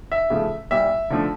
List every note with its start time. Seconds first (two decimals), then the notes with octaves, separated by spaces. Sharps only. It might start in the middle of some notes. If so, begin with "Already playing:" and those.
0.12 E5
0.30 C#3 F3 A3
0.71 A#2 G3 E5
1.10 D3 F3 A3